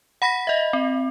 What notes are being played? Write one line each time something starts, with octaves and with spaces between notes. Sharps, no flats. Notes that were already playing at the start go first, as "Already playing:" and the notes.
F#5 B5 A#6 B6
D#5 E5
C4